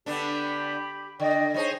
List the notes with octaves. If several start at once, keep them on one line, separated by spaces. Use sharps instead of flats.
D3 B3 D4 G4 B5
D3 D5 D#5 G5
G3 D#4 G#4 C5 C#5 D#5